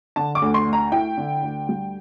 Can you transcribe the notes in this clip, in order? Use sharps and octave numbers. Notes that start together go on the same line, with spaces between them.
D3 A5
D6
D2
C6
A3
A#5
E4 G5
D3
D2
G3